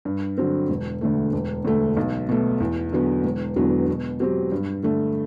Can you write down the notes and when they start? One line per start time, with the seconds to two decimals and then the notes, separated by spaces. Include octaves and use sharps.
0.05 G2
0.38 D3 F#3 C4
0.69 E1
1.01 D2 D3 A3
1.33 E1
1.64 D2 D3 A3
1.97 B1
2.29 B2 A3
2.60 E2
2.93 D3 F#3 B3
3.24 E1
3.56 E2 D3 F#3 B3
3.88 B2
4.20 F#3 C4 G4
4.52 G2
4.83 D3 A3